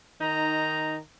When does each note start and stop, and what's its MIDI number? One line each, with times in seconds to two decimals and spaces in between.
0.21 0.97 51
0.21 0.97 63
0.21 0.97 82